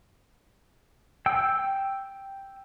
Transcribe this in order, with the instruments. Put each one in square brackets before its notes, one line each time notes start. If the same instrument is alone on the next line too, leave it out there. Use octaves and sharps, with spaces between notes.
[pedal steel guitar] G5 E6